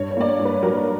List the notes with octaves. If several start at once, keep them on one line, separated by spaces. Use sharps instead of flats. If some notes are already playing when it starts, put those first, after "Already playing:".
Already playing: G2 C#5
C#5
A#3 D5
C#5
G2
B4
F#3 A#4